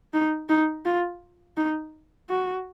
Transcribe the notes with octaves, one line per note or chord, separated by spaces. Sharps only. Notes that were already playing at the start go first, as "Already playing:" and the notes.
D#4
D#4
F4
D#4
F#4